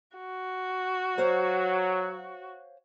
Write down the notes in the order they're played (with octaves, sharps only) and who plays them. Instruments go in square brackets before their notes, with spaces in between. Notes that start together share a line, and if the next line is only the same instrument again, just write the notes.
[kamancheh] F#4
[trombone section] F#3 [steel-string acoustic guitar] C5 C#5 F5